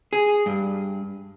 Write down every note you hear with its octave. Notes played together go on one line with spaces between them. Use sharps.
G#4
G2